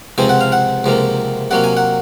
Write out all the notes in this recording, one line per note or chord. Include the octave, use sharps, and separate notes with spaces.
C#2 C3 F3 C4 G#5
F#5
F5
F#5
C#2 C3 F3 A#3
C3 F#3 A#3 F#5
G#5
F#5